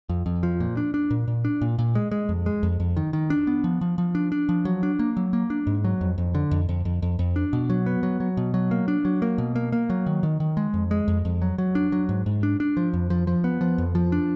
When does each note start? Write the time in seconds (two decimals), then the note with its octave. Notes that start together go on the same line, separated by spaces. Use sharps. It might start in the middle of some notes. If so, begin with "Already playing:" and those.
0.09 F2
0.26 F2
0.43 F3
0.60 A#2
0.77 D4
0.94 D4
1.11 A#2
1.28 A#2
1.45 D4
1.61 A#2
1.79 A#2
1.95 G#3
2.11 G#3
2.29 F2
2.46 G#3
2.63 F2
2.80 F2
2.97 D#3
3.13 D#3
3.30 D4
3.47 B3
3.64 F3
3.81 F3
3.98 F3
4.15 D4
4.32 D4
4.49 F3
4.65 F#3
4.83 D4
4.99 A#3
5.17 F#3
5.33 A#3
5.50 D4
5.67 G#2
5.84 F#3
6.01 F2
6.18 F2
6.35 D3
6.51 F2
6.69 F2
6.85 F2
7.02 F2
7.19 F2
7.36 D4
7.53 B2
7.70 F#3
7.86 B3
8.03 F#3
8.20 F#3
8.37 B2
8.54 F#3
8.71 A#3
8.88 D4
9.05 F#3
9.22 A#3
9.38 B2
9.56 A#3
9.72 A#3
9.90 F#3
10.06 D#3
10.23 D#3
10.40 D#3
10.57 G#3
10.74 F2
10.91 G#3
11.08 F2
11.25 F2
11.42 F#3
11.58 F#3
11.75 D4
11.92 F#3
12.09 G#2
12.26 G#2
12.43 D4
12.60 D4
12.77 F3
12.93 F2
13.10 F3
13.27 F3
13.44 B3
13.61 F3
13.78 F2
13.95 F3
14.12 D4